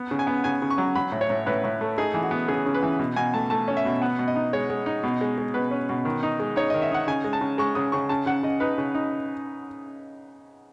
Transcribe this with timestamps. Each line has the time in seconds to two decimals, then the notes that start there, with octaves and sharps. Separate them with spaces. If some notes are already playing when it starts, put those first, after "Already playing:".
Already playing: B3
0.11 C#3
0.19 G#5
0.27 B3
0.44 C#3 G#5
0.62 C#3
0.70 C#6
0.78 F#3
0.95 F#3 B5
1.12 A2
1.21 C#5
1.30 A2
1.46 A2 B4
1.64 A2
1.81 A3
1.98 D#4 G#4
2.14 E3
2.23 F#4
2.31 B3
2.48 C#3 G#4
2.66 C#3
2.74 B4
2.83 E3
2.99 B2
3.16 B2 G#5
3.34 A3 A5
3.50 A3 A5
3.68 C#4
3.77 E5
3.85 B2
4.02 B3 F#5
4.19 B2
4.28 D#5
4.36 D#4
4.53 G#3 C#5
4.70 G#3
4.86 D#4
5.03 B2
5.21 G#3
5.38 G#3
5.54 B2 B4
5.71 C#4
5.89 B2
6.05 D#3
6.23 D#4
6.40 G#3
6.56 D#4 C#5
6.70 D#3 D#5
6.82 E5
6.91 D#4 F#5
7.08 C#3 G#5
7.24 G#3
7.33 A5
7.41 C#3
7.58 G#3 C#6
7.75 C#3 D#6
7.92 C#3 C#6
8.09 C#3 A5
8.26 C#3 F#5
8.43 C#3 D#5
8.60 D#4 B4
8.78 C#3
8.95 D#4